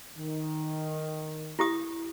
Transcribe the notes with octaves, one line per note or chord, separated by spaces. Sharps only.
D#3
E4 G4 D#6